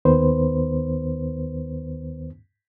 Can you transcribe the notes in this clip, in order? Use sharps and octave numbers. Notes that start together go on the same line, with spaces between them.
D#2 D#3 B3 B4 C5